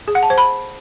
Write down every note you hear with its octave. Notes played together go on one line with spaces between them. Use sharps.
G#4
F#5
A5
C5
B5